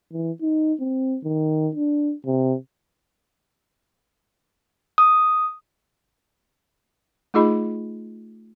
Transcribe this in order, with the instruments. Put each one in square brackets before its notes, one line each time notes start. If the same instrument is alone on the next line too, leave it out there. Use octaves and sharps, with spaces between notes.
[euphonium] E3
D#4
C4
D#3
D4
C3
[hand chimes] D#6
[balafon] A3 D#4 F4 G#4 D#5 B5